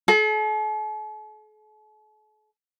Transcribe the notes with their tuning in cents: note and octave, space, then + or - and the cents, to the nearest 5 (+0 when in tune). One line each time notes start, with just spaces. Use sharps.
A4 -45